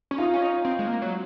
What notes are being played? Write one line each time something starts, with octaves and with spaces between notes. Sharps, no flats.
C#4
D#4 F4
C#4
D#4
C4
G#3
A#3
F#3